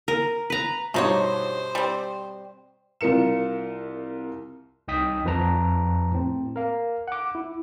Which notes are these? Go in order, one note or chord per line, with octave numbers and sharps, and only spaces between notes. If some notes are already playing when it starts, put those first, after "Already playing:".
A#4
B4 A#5
G2 B2 F3 D#4 C5 C#5 D#5
G3 C4
C2 F4 A#4 C#7 E7
C2 D#4 D#5 G5 D#6 B6
F2 F3 B4 A5 A#5
A2 C4
A#4 F5
F#5 D6
E4